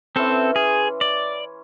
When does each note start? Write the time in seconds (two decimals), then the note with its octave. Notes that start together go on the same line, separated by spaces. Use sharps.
0.16 E3 C4 C#4 A4 C6
0.56 G#4
1.01 D5